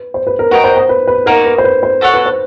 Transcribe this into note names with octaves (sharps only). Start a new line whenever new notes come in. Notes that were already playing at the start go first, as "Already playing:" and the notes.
Already playing: B4
C5
B4
A#4
F#4 A#4 B4 D#5 G5
C5
C5
B4
B4
A#3 D#4 F#4 A#4
B4
C5
B4
C5
F#4 A4 C#5 F#5
B4
C5